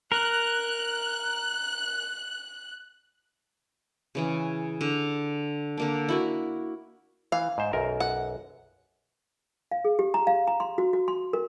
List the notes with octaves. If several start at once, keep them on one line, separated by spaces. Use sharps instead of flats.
A#4 F#6
C#3 E3 G#4
D3
D3 A#3 D4
E4 F#4 A#4
E3 F5
G#2 C5
B1 F#2 A#4
F#5
F5
G#4
G4
A#5
F5
A#5
C6
F#4
F#4
C6
A#4